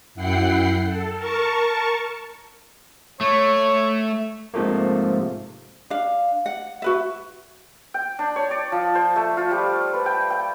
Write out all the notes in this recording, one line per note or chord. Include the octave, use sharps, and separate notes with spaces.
F#2 E4 F#5 G5 C7
A4
A#4 A5 C#6
A3 C#5
G#2 C3 F3 A3 A#3
D4 F5
F#5
F#4 B4 E5
G5
D4
C#5
D5
F3
C5
A3
F4
G3
B4
G5
G5